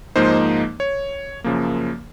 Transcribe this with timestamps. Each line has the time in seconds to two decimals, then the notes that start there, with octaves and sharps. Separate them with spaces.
0.16 G#2 F3 A#3 D#4 C5
0.80 C#5
1.44 F#2 C#3 F3 A#3